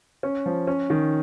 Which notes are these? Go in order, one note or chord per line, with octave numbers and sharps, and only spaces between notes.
C#4
F3
C#4
D#3